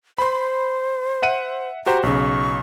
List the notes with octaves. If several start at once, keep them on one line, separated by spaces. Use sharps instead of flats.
C5 B5 C6
E5 F#5 D#7
F#4 G4 C5 A#5
B1 C#3 C#6